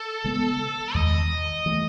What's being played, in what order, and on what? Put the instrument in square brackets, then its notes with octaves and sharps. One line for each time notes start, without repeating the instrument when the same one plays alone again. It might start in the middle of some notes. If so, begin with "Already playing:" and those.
Already playing: [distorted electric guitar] A4
[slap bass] C#3 G#3 B3
[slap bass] E2 D#3 G#3 [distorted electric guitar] D#5
[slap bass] E3 A3